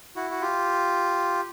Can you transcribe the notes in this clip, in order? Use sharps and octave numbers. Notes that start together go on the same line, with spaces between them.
E4 F#4
F#4
F4 G4